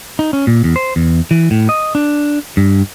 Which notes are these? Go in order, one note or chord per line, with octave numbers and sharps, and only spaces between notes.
D#4
C#4
A#2
E2
C5
E2
E3
A2
D#5
D4
G2